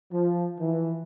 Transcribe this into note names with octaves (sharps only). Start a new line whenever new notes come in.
F3
E3